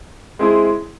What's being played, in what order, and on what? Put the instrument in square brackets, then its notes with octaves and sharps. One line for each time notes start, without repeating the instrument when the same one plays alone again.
[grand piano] G#3 C4 E4 G#4